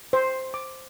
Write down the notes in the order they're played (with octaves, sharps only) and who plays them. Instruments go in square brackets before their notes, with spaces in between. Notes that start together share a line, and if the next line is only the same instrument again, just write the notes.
[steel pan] C5
D6